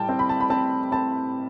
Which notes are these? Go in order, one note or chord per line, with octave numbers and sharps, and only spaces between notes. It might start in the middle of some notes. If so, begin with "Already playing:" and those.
Already playing: A2 G3 G5 A5
C4
B5
A5
B5
C4 A5
C4 A5